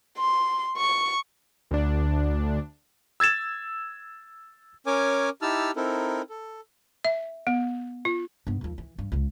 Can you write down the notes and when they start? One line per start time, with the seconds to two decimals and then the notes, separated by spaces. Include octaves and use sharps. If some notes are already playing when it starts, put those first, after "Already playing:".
0.18 C6
0.77 C#6
1.71 D2 D4
3.20 E6 G#6 A6 E7
4.86 C#4 A#4 C#5 G#5 D6
5.42 D#4 E4 G4 A5 E6 F6
5.76 C4 D#4 E4 A4 A#4
6.29 A4
7.05 E5
7.47 B3
8.05 F4
8.47 G2 B3
8.61 D#2 F3
8.78 E3
8.98 G2
9.12 C#2 C#3